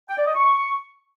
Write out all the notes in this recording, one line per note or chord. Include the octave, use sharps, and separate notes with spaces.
G5
D5
D#5
C#6